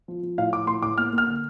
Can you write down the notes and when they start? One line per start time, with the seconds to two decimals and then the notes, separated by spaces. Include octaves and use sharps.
0.08 F3
0.23 F3
0.38 A2 F5
0.53 F3 D6
0.67 A2 C6
0.82 A2 D6
0.98 A#3 F6
1.12 A#3
1.18 F6
1.28 D3